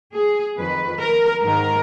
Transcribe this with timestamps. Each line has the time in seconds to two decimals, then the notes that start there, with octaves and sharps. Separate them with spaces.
0.14 G#4
0.57 F2 D#3 B4
1.00 A#4
1.42 G#2 D#3 A#4